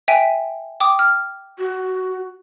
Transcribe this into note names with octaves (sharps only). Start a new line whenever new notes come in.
E5 G5 G#5
G5 D6 D#6
F6
F#4